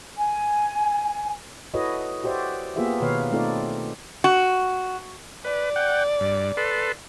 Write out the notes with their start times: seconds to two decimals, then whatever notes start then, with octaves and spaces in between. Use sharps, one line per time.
0.16 G#5
1.74 E4 F#4 A4 B4 C#5 D#5
2.24 F#4 G4 C5 D5 E5
2.76 A#3 B3 F4 G4 G#4 E5
3.01 B2 D#3 B4 C#5 F5
3.32 A3 C4 D#4 F4 A4 D5
4.24 F#4
5.44 B4 D5
5.76 F#5 G5
6.21 G2
6.57 A4 B4 C6